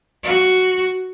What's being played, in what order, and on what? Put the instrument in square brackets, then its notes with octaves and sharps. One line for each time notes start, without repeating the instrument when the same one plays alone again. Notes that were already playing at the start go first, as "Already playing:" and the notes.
[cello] F#4